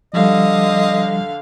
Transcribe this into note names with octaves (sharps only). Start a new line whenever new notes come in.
D3 F3 G3 D#5 F5